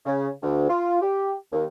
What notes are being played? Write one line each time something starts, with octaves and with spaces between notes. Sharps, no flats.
C#3
D2
F4
G4
D#2